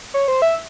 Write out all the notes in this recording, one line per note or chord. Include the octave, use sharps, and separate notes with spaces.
C#5
C5
E5